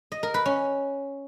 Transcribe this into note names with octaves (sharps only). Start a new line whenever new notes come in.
D#5
A#4
B4
C#4